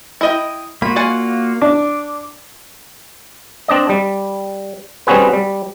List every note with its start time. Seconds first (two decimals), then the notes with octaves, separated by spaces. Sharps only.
0.21 E4 D#5 G5
0.82 A#3 F4 F#4 B5
0.96 D5 F#5 G#5
1.62 D4 D6
3.68 C4 D4 D5 D#5
3.89 G3
5.07 G3 C4 C#4 F#4 G#4 B4
5.33 G3